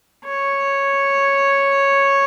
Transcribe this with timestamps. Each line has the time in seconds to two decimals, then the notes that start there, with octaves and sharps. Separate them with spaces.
0.25 C#5